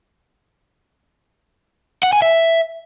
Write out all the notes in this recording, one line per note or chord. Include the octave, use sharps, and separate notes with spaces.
F#5
G#5
E5